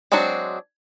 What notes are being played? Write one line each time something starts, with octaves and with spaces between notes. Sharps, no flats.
F#3 G#3 C4 D4 F#4